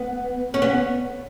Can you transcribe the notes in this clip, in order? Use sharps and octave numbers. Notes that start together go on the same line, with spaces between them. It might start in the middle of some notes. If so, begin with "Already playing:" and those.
Already playing: B3
C#4
B3